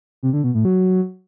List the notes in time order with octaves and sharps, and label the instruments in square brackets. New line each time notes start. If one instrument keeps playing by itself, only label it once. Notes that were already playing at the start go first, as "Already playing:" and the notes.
[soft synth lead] C3
D3
B2
A2
F#3